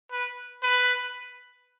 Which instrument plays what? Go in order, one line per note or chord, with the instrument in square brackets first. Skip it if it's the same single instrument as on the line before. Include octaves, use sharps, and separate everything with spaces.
[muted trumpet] B4
B4